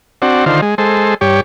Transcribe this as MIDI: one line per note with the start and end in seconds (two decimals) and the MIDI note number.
0.22 0.45 60
0.22 0.45 62
0.22 0.45 66
0.46 0.61 50
0.46 0.61 51
0.46 0.61 65
0.46 0.61 72
0.62 0.75 56
0.78 1.14 56
0.78 1.14 69
0.78 1.14 72
1.21 1.41 43
1.21 1.41 67
1.21 1.41 73